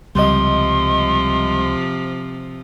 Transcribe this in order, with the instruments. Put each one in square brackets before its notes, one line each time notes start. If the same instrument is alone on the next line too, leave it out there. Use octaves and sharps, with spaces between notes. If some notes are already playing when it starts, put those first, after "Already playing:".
[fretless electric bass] C#2 [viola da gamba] C3 F3 [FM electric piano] G3 D#5 [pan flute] C6